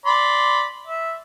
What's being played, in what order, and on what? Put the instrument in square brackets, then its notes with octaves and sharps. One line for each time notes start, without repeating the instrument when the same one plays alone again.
[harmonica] D5 B5 C6
E5